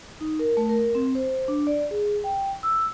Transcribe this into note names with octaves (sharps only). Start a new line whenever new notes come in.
D#4
A#4
A3
A#4
C4
C5
D4
D5
G#4
G5
E6